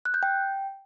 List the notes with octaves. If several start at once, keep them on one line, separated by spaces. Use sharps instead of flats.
F#6
G6
G5